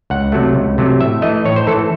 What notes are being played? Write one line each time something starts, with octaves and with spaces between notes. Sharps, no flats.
C#2 F#5
C3 F#3 A3
C#2
C3 F#3 A3
A2 E5
E3 A3 D#5
A2 C#5
C5
E3 A3 A4